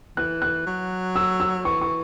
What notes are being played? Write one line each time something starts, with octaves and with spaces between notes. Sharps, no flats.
E3 F#6
F#6
F#3
E6
E6
E3 C#6
C#6